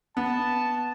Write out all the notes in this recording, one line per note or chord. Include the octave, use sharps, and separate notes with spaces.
B3 A5